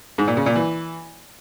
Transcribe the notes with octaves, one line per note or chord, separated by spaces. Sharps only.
G#2
A#2
C#3
A#2
E3